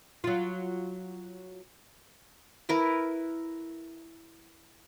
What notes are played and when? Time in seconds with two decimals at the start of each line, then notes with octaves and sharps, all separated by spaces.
0.24 F#3 F4
2.69 E4 A#4 B4